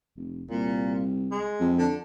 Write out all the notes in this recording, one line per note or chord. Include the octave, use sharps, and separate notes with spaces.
F1
C2 A#2
G#3
F2
D3